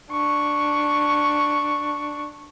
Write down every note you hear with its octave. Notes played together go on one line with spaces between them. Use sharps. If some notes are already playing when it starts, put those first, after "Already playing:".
D4 C#6